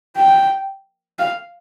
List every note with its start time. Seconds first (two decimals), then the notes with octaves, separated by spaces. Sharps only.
0.16 G5
1.19 F5